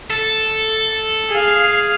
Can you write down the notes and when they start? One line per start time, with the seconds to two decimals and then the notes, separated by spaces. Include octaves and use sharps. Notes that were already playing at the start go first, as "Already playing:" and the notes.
0.10 A4
1.29 G#4 F5